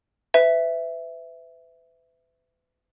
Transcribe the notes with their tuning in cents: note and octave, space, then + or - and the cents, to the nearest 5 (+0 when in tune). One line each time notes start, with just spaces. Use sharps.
B4 +35 E5 +0